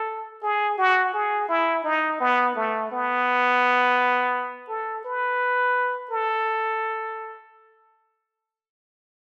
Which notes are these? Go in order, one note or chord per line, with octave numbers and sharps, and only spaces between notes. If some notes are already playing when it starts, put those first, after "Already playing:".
Already playing: A4
G#4
F#4
G#4
E4
D#4
B3
A3
B3
A4
B4
A4